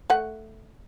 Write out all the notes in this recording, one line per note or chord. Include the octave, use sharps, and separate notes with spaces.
A3 F#5